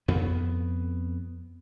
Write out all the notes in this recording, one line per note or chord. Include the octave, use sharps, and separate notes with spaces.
F2 B3